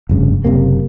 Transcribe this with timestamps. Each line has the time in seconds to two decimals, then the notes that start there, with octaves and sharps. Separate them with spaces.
0.09 F1 G2 C#3
0.44 F#1 C3 A#3